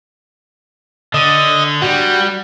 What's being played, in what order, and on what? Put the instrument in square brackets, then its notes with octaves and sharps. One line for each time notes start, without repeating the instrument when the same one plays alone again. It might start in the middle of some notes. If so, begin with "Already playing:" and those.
[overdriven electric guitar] D3 [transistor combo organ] D#5
[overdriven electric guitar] G3 [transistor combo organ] F#4